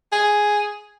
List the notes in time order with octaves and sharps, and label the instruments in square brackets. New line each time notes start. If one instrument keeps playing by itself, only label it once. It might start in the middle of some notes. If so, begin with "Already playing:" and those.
[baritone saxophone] G#4